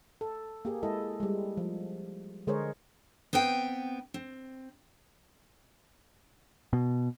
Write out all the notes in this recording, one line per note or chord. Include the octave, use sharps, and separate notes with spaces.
A4
A#3 G4 G#4
G#3 E4 A4 D#5
G3 G#3
F3
D3 G#3 G#4 A#4 C5 C#5
B3 C4 B4 G5
C4
B2